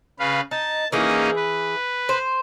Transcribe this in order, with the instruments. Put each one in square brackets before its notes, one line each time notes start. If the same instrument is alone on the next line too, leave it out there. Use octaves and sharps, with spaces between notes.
[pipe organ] C#3 B4 F5
[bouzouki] D#4 [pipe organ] A5
[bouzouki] E3 G#4 [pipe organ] A#3 C#4 D#4
[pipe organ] B4
[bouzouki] C5